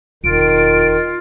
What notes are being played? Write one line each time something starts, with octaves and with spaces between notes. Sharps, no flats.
E1 D#3 F4 D7